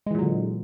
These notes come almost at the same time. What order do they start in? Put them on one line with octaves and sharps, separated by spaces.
G#3 E3 A#2 F#3 D3